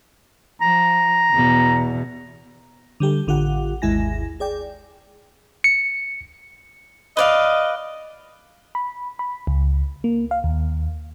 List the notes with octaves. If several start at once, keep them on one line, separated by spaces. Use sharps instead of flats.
F3 A#5
E2 B2
D3 G3 G4 A4
A1 D3 F4 G4 F#5
G#1 D#2 G#3 E4 G#5 A#6
G#4 D5 G5
C#7
B4 D5 D#5 F5
B5
B5
C#2
A#3
F5
D#2